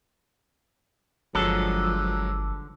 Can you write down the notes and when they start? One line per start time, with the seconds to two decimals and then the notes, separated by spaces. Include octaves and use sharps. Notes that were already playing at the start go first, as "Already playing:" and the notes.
1.35 G1 G2 D3 F3 F#3 G#3 A4